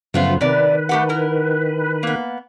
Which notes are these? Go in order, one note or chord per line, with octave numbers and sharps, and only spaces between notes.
F#2 C#3 F3 A3 B3 F4
C3 D#3 B4 D5
A3 G4 F#5
E4 A#4
A#3 B3